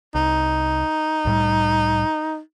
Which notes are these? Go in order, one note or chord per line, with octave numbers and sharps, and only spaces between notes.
C2 D#4
C2 A2 G3